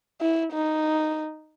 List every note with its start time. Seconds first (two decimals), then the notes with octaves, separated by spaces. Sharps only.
0.21 E4
0.53 D#4